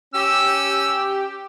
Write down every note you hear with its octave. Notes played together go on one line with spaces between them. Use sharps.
C#4 G4 E6